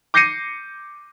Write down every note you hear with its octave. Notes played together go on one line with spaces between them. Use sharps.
D6 G6 A#6 C7 C#7 D#7